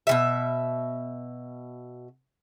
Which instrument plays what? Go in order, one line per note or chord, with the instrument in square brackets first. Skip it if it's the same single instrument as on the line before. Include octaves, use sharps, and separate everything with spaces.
[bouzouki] B2 E3 E5